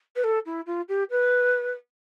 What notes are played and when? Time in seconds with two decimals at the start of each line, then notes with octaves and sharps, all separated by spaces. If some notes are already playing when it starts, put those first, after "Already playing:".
0.16 B4
0.24 A4
0.46 E4
0.66 F4
0.89 G4
1.10 B4